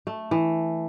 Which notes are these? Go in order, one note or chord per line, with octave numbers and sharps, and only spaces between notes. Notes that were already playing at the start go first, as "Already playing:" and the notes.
A3
E3